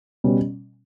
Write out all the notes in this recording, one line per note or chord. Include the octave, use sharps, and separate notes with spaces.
B2 G3 C#4